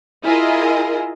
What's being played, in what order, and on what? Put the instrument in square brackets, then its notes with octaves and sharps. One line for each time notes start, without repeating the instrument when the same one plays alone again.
[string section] E4 F4 G#4 A#4 D#5